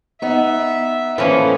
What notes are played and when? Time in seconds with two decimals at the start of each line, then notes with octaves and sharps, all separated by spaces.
0.22 B3 D#4 E5
1.18 A2 E3 F3 A#3 C#4 F4 A4 F5